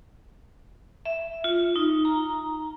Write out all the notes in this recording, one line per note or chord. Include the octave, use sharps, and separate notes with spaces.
E5
F4
D#4
A#5